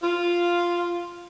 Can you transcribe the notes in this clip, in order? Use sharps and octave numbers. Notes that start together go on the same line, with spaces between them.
F4